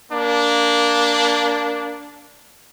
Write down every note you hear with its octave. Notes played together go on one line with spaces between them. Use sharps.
A#3 D4